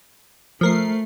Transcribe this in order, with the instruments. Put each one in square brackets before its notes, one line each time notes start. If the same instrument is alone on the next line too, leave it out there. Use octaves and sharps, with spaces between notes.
[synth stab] F3 A#4 C7 [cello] A3